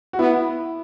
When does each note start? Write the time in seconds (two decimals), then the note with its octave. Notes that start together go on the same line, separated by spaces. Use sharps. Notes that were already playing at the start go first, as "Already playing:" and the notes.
0.13 F#4
0.19 B3 E4